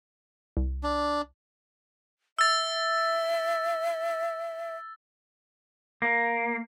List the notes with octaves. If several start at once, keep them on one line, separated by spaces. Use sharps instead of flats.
C2
D4
E5 E6 A6
A#3